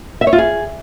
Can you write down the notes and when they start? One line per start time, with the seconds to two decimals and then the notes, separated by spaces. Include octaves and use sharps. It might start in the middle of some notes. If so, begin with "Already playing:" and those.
0.21 E5
0.27 C#5
0.33 F4
0.38 G#4